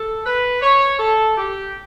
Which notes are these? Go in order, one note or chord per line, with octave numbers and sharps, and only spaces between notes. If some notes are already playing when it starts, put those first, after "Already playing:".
Already playing: A4
B4
C#5
A4
G4